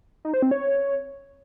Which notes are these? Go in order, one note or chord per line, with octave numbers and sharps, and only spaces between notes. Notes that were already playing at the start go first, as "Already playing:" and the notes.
D#4
C5
C4
C#5